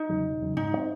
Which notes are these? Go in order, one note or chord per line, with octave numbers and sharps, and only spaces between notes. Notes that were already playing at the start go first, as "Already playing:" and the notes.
Already playing: D#4
E2 C#3 F#3
E1
E2 C#3 F#3
G#2 D#4
E3
C4